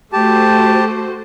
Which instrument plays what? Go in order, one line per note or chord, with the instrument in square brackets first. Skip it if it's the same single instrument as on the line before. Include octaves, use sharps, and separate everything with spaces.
[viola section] A3 F#4 C5 [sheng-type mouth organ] G4 A5